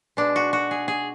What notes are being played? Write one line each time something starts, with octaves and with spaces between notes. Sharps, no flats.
B2 G#3 D4
F#4
F#4
G#4
G#4